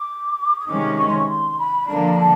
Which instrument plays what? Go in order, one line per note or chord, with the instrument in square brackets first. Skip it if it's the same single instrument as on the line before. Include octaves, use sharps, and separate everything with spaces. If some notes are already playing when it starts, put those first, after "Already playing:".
Already playing: [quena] D6
D#6
[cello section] C3 D#3 G#3 C#4 [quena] D6
[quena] C#6
C6
C#6
C6
B5
[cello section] D3 F3 A#3 D4 [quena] A#5
[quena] A#5
A5